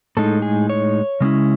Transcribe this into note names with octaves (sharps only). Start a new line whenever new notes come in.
A2 G#3 D#4 A4
G#4
C#5
C#3 G#3 C#4 E4